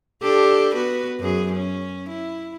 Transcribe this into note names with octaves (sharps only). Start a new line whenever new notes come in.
D4 G4 A4
B3 F#4 B4
F#2 G#4
C#4
E4